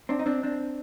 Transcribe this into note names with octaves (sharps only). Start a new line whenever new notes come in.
C4 D4
D#4
C4 D4
C4 D4